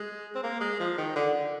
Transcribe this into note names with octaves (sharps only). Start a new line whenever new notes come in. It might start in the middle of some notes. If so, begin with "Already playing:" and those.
Already playing: G#3
C4
A#3
G#3
F3
D#3
D3
D3